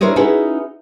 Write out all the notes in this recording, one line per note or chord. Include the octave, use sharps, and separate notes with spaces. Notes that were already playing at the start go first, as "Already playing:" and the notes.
D4 E4 A#4 C5 C#5 D#5
C#4 D#4 E4 F#4 G#4 B4